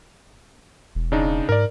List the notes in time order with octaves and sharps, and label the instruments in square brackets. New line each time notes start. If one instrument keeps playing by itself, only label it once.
[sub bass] E1
[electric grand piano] C#3 D4 D#4
[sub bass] G#2 [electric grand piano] A#4 D5